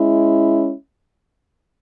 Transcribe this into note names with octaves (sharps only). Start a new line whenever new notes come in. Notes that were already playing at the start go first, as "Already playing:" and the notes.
Already playing: G#3 C#4 E4